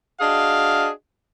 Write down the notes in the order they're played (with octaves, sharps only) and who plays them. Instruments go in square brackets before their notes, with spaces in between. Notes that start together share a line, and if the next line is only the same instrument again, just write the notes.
[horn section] D4 F#4 G#4 D#5 F5